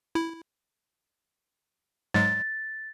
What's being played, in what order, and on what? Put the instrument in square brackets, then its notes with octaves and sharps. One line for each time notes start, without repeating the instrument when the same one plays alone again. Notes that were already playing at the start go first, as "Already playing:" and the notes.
[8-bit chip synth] E4
[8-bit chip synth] G#2 F#3 G#3 [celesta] A6